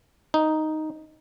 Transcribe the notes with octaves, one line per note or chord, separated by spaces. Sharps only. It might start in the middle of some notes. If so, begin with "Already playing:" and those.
D#4